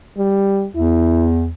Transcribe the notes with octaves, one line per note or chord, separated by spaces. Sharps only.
G3
E2 E4